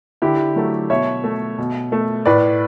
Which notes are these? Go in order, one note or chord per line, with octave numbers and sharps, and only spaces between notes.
D3 E4 G4
F#3 A3
B2 C#5 E5
A3
B2
A3
A2 B4 D5